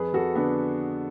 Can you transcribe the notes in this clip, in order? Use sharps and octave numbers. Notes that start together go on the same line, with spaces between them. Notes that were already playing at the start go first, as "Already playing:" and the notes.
Already playing: F2 G#4 B4
F2 F#4 A4
D3 B3 D4